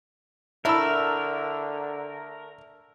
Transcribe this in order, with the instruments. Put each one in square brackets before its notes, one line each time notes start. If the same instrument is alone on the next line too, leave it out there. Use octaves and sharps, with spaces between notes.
[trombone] D3 [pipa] A3 D4 E4 [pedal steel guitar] A#4 [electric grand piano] E5 E6